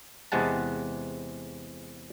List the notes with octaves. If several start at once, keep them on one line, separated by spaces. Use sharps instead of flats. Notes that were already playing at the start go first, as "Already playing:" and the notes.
E2 C3 G#3 F#5 A5